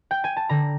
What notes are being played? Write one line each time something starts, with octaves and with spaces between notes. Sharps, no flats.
G5
G#5
A5
D3 A#5